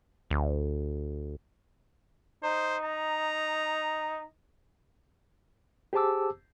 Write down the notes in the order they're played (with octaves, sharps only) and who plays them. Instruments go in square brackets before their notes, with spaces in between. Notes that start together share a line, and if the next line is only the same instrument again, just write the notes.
[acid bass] D2
[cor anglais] D#4 [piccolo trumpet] C5
[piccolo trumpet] A#5
[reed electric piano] G4 G#4 C5 A5 D6 E6